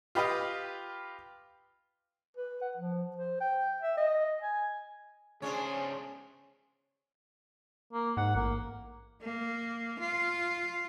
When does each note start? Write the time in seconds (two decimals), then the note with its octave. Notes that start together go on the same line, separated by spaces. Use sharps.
0.15 F4 G4 B4 D#5 F5 G5
2.37 B4
2.61 F#5
2.77 F3
3.16 C5
3.40 G5
3.82 E5
3.97 D#5
4.41 G#5
5.42 C#2 C#4 D4 G#4 C5 C#5
7.93 A#3
8.17 G#2 F#5
8.35 A1 A#3
9.22 A#3
10.00 F4